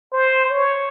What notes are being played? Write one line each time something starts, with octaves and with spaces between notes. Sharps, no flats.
C5
C#5